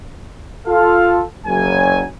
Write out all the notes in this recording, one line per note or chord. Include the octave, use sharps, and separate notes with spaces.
F4 A4 F5
F#1 F#3 G#5